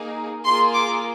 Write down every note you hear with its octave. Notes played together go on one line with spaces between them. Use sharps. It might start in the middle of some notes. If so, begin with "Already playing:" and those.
Already playing: A#3 D#4 G#4
A#3 F4 G#4 C6
D6